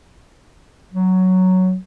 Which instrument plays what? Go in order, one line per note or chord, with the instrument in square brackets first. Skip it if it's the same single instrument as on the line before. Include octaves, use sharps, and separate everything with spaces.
[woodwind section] F#3